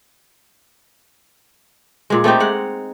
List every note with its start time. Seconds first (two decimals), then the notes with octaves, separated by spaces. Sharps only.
2.10 A#2 G#3
2.24 A3 C4 D#4 G4
2.40 G#3 F#5